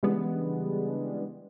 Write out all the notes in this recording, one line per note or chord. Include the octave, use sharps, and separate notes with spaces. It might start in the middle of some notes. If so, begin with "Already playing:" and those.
C#3 E3 G3 G#3 B3 D4